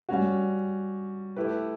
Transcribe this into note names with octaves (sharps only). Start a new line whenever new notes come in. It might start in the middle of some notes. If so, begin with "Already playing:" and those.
G3 C#4 F#4
A3 E4 G4 B4